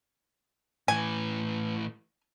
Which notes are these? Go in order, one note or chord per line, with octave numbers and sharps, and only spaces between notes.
A2 E3 G#5